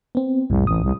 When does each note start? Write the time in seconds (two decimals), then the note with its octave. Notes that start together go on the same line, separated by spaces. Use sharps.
0.15 B3 C4
0.50 C2 F2 A2
0.67 A1 D#6
0.83 C2